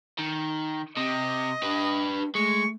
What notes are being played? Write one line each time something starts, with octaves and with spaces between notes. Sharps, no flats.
D#3
C3 D#5
D4 G4 B4
G#3 A3 C#6